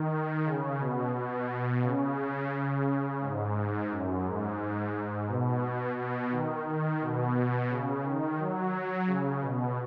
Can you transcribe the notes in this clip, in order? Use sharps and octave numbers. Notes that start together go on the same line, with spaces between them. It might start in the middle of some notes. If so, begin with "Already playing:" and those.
Already playing: D#3
C#3
B2
B2
C#3
G#2
F#2
G#2
B2
B2
D#3
D#3
B2
C#3
D#3
F#3
C#3
B2